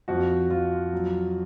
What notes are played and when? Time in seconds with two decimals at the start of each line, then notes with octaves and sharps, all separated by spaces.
0.08 F2 F#4
0.50 F2 F4
0.93 F#3